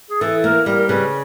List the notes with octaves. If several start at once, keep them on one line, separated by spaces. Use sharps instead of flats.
G#4
E3 A4
A#3 A#4
G3 A#4
A#4
C#3 B4